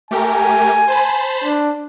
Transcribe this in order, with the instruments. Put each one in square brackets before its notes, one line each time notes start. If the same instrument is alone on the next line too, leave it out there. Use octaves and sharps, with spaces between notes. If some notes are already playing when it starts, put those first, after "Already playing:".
[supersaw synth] A3 G4 A#4 [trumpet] G#5
[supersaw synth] C5 A5 B5
[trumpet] D4